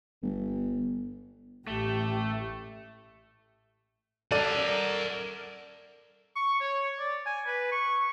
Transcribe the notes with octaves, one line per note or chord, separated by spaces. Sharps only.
G1
A1 A3 G4
A4 A#4 D5 F#5 D#7
C#6
C#5
D5
G#5
B4
C#6